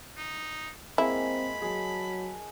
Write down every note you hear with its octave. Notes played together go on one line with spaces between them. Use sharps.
D#4
G#3 A#3 C4 E4 G#4 B5
F#3 G#4 A5